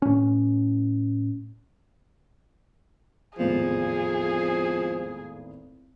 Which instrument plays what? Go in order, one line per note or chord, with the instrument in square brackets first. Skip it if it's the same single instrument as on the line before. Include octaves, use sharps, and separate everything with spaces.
[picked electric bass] A2 C#4
[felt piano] G#1 E2 A2 [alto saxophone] F3 [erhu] G#4